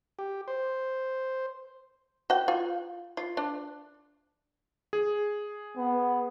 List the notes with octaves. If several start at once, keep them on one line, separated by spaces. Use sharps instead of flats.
G4
C5
F#4 G5
F4
F4
D4
G#4
B3